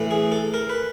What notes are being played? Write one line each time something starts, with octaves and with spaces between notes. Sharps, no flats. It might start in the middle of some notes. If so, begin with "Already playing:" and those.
Already playing: A2 E3
G#4
A4
A#4
B4